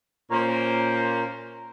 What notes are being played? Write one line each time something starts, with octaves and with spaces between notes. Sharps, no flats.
A#2 A#3 C#4 A#4 C5